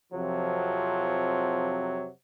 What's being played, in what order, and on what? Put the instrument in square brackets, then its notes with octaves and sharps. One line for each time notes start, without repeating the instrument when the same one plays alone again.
[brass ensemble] F2 C3 F3 F#3